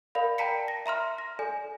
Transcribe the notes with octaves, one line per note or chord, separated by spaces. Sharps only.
A#4 D5 F5 B5
D5 G5 A5 A#5 B6 C#7
A#6
E5 A#5 C6 F6
A#6
A4 D5 G#5